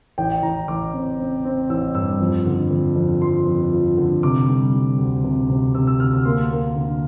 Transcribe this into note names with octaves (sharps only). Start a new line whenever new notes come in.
A1 G5
A1 A#5
A1 D6
C4
C4
C4
A1 E6
G2 E6
F2
D3
F2
F2
F3 C6
F2
F3
D3
C3 D6
G3
G3
D2
C3
C3
C3 E6
E6
D2 F6
E6
A#3 C6
A#3
D3